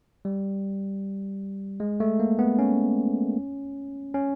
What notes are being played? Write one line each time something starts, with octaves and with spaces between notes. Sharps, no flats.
G3
G#3
A3
A#3
B3
C#4
C#4